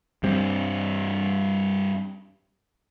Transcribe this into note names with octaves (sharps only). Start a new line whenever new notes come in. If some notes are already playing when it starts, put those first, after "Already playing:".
G2 G3 C4